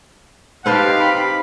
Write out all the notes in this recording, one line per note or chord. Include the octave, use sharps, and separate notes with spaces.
C4 D#4 G4 B4 C5 F5 A5
B5